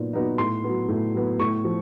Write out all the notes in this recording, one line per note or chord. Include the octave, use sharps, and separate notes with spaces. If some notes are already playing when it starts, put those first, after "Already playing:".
Already playing: A#2 F#3 B3 D#4
F#3 B3 D#4
A2 C6
F#3 B3
A2
F#3 B3
A2 C#6
F3